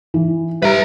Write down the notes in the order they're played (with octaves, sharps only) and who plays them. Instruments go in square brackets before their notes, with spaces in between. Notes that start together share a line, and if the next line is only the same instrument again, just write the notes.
[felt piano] E3
[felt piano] G3 E5 [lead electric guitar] B4 A#5